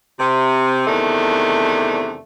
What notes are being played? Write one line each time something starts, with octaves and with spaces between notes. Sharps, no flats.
C3
E2 C3 D#3 A3 D4